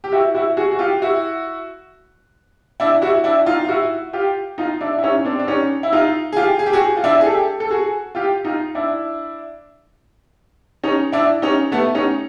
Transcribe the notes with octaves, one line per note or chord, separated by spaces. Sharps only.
G4
E4 F#4
E4 F#4
F#4 G#4
F#4
F4 G4
E4 F#4
D4 E4
E4 F#4
D4 E4
D#4 F4
F4
E4 F#4
F4 G4
D#4 F4
D4 E4
E4
C#4 D#4
C4 D4
D4
C#4 D#4
E4
D#4 F4
G#4
F4 G4
G#4
G4
F#4 G#4
F4
D4 E4
G#4
G4 A4
A4
F#4 G#4
F4 G4
D#4 F4
D4 E4
C#4 D#4
D4 E4
C#4 D#4
A3 B3
C#4 D#4